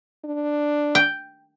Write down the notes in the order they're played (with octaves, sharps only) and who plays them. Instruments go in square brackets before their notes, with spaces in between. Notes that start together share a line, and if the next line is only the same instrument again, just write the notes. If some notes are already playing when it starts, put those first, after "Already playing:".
[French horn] D4
[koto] G5